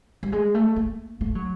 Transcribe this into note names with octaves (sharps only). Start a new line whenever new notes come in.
G3
G#3
A3
A#3
A3
F#3